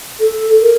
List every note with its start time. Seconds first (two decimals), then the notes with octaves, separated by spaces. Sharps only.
0.20 A4
0.62 A#4